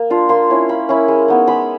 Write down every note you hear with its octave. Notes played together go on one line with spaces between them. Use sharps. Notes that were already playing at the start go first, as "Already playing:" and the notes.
Already playing: A#3
D4 F4
A#3 C6
C#4 E4
A#3 B5
C#4 E4
G#3
B3 D#4
G#3 B5